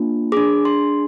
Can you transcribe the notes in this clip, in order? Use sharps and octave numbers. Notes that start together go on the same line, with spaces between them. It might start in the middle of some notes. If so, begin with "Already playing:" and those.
Already playing: A#3 D4 F4
D4 G#4 D6
C6